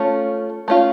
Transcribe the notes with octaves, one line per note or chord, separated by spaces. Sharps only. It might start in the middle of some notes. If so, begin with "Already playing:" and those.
Already playing: A3 C#4 F4
A3 C#4 F4